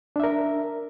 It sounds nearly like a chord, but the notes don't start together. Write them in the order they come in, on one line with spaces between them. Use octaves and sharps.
D4 E5 A#4